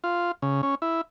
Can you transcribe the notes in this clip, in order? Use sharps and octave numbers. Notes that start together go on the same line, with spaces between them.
F4
C#3
C#4
E4